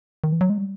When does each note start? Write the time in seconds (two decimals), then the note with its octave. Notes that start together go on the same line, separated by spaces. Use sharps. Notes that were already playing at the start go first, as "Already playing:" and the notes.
0.24 D#3
0.32 E3
0.41 F#3
0.50 G#3
0.58 G3